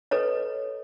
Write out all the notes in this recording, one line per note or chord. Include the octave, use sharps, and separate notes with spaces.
A4 B4 C#5 D#5